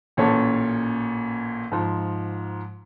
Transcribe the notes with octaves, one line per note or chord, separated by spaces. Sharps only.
A1 A#2 C#4 A4 C#5 A5
G#2 F3